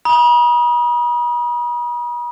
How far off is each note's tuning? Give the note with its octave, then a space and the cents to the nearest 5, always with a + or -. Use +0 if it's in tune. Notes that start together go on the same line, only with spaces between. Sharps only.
B5 -45 D#6 +0